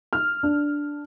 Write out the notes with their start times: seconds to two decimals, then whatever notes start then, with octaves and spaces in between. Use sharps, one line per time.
0.13 F6
0.43 D4